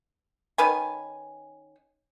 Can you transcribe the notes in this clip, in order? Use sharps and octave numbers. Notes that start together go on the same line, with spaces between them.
D#3 C#4 B4 G#5